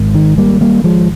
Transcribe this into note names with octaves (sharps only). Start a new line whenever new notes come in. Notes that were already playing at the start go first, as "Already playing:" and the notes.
Already playing: G#1 G#2
D#3
G3 A#3
G3 A#3
F3 G#3